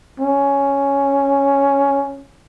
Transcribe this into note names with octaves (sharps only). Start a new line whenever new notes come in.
C#4